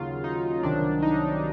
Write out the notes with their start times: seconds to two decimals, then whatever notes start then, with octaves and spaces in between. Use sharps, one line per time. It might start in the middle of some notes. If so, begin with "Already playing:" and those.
Already playing: D#2 C#3 F#3 F4
0.24 D#4
0.63 C2 C3 D#3 F#3 D4
1.02 D#4